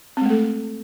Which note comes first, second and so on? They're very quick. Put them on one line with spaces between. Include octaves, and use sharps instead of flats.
C4 G#3 A3 A4